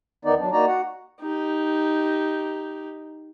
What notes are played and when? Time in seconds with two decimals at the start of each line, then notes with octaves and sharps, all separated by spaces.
0.25 E2 D#3 B3 D#4 D5
0.39 F#3 D4
0.52 A#3 D#4 F#4 D5 A#5
0.68 F#4 F#5
1.21 D#4 G4